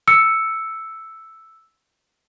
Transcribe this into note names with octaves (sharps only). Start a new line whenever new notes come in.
E6 C#7